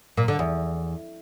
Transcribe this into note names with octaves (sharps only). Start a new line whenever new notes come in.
A#2
D3
E2